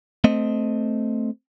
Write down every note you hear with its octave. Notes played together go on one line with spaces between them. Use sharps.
A3 C4 D#5